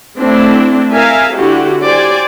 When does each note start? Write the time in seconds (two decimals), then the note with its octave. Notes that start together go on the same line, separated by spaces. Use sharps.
0.17 A3 C4 D4 E4
0.92 A#4 E5 F5 G#5
1.34 D3 E4 F#4 G4
1.82 G4 C5 D5 G#5